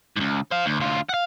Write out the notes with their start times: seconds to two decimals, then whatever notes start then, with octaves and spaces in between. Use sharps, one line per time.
0.16 C#2 G#2
0.51 C5 F5
0.66 D2
0.80 D2 F4
1.09 F5 F#5